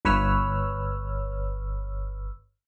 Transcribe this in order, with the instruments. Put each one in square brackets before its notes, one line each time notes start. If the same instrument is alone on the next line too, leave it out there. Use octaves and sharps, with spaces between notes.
[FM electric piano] G1 B4 C#5 E6 F6